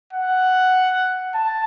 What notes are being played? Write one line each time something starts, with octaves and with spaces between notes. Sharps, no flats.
F#5
A5